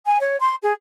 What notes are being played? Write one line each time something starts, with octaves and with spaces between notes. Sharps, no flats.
G#5
C#5
C6
G#4